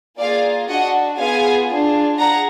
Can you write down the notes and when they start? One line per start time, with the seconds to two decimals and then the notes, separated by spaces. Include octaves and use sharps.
0.19 A#3 F4 G#4 D5 F5
0.69 D4 F#4 D#5 F#5
1.19 B3 F4 G#4 F5 G#5
1.69 D4 F4 G#4
2.18 G#4 F#5 A#5